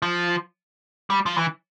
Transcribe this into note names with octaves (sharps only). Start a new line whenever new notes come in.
F3
G3
F3
E3